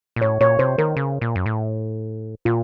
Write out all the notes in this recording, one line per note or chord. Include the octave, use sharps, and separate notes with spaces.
A#2
A2 C#5
A#2 C#5
C3 C5
D#3 A#4
C#3
A#2
F#2
A2
A#2 F4